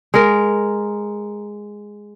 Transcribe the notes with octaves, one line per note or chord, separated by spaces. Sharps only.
G#3 A#4